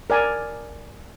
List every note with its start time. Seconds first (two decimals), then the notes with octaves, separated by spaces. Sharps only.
0.10 A#4 D5 G#5